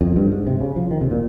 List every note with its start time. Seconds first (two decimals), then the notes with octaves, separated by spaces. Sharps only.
0.01 F2
0.16 G2
0.32 G#2
0.47 C3
0.61 C#3
0.76 F3
0.91 D#3
1.01 C3
1.11 A#2